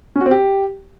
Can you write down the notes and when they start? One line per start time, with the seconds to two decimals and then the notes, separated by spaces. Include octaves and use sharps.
0.16 C#4
0.21 F#4
0.26 C4
0.31 G4